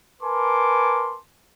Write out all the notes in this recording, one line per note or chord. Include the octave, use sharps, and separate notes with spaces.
A#4 B4 G#5 A5 C6 D6